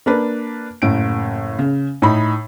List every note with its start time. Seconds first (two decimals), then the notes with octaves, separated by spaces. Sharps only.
0.06 A#3 D4 B4
0.82 F#1 A2 D7
1.59 C#3
2.02 A2 D#4 B5